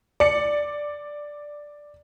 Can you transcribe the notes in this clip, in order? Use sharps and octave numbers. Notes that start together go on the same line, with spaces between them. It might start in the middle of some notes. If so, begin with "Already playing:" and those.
D5 C#7